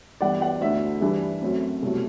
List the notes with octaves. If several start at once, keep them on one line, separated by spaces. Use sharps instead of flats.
G2 E3 B3 D5 F#5
D5 F#5
D2 D3 A3 D4 E5
G2 E3 G3 D4
F#2 F#3 A3 C4
C2 B2 F#3 A3